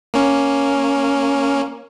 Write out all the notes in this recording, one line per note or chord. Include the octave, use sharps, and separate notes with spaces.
A#3 C#4